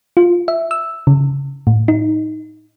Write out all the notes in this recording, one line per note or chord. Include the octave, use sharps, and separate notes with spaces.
F4
E5
E6
C#3
A2
D#4